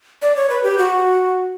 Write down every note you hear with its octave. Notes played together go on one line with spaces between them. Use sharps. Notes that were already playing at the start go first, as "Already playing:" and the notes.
D5
C#5
B4
G4
F#4